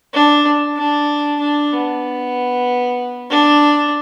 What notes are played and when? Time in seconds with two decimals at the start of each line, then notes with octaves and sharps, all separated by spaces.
0.14 D4
0.77 D4
1.40 D4
1.73 B3
3.30 D4